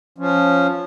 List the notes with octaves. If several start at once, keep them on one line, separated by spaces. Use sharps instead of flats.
F3 C#4